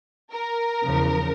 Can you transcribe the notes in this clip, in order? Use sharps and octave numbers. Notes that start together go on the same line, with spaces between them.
A#4
E2 C#3 F3